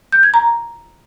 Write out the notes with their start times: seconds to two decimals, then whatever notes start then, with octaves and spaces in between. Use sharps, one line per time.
0.12 G6
0.23 G#6
0.34 A#5